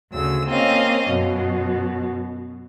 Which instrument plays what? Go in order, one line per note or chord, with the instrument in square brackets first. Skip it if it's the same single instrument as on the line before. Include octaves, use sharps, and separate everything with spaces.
[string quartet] D2 C#3 E6
A#3 C4 C#4 D#5 F5
F#2 B2